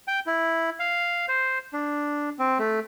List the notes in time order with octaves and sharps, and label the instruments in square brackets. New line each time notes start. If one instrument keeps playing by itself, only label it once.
[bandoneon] G5
E4
F5
C5
D4
C4
A3